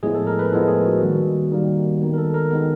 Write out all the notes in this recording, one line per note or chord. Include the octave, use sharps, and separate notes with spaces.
A2 F3 G#3 B3 G#4
A4
A#4
B4
A2 F3 G#3 B3 A4
G#4
F#4
D#3 G3 A#3
D#3 G3 A#3
D#3 G#3 B3
A#4
A4
A#4
D#3 G#3 B3 A#4